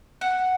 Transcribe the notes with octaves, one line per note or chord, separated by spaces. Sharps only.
F#5